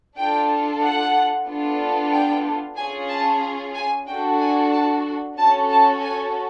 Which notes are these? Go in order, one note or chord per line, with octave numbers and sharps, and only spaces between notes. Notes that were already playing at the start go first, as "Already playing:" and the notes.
D4 F4 A4 G5
F#5
B3 D4 F4 A4
G5
C#4 F4 G#4 G#5
A5
G#5
D4 F#4 A4 G5
G#5
A5
C#4 F#4 A4 A5
A5
G#5